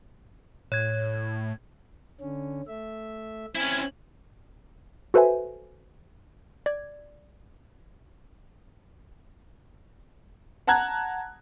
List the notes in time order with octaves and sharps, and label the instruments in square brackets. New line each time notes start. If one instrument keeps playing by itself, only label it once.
[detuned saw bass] A2 [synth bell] C#5 G#6
[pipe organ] D3 C#4
A3 E5
[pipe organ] C4 G#5 G#6 [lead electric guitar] C#4 E4
[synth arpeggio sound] F#4 A4 B4 C5 E5 G#5
D5 G#6
[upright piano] F#5 A5 A#5 F#6 G#6